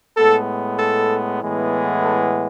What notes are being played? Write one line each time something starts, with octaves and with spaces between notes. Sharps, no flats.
A2 G#3 B3 A4
A4
A2 E3 G#3 B3
A4